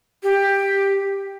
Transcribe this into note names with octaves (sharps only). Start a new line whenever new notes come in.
G4